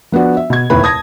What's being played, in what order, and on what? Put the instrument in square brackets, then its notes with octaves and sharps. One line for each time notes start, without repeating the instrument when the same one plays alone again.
[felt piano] F3 B3 D4 F#4
E5
B2 G#6
F1 D#2 A#2 E4 B4 B5
A5 D#6 G#6 A#6